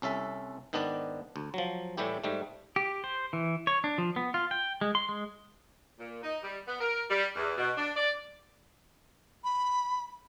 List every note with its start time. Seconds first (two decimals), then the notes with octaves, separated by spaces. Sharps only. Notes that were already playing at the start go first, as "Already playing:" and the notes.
0.02 C2 C#4 A4 E5
0.73 G#2 D#3 B3 D4 D5
1.36 D2
1.54 F3 F#3
1.97 A2 E3 G3 A3 E4 G4
2.24 G#2 G3 A3
2.76 G4
3.04 C5
3.33 E3
3.67 C#5
3.84 D4
3.98 F3
4.16 B3
4.34 F4
4.51 G5
4.81 G#3
4.95 C6
5.09 G#3
5.99 A#2
6.22 D#4
6.43 G3
6.67 B3
6.80 A#4
7.10 G3
7.36 E2
7.57 B2
7.77 D4
7.96 D5
9.44 B5